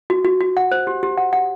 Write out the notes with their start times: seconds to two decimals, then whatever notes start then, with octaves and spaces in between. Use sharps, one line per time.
0.10 F#4
0.25 F#4
0.40 F#4
0.57 F#5
0.72 C5
0.87 G4
1.03 G4
1.18 F#5
1.33 F#5